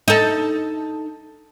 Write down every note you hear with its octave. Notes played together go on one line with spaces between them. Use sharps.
D#4 A4